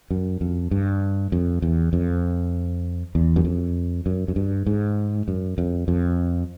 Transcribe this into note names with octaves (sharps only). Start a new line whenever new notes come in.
F#2
F2
G2
F2
E2
F2
E2
F#2
F2
F#2
F#2
G2
G#2
F#2
F2
F2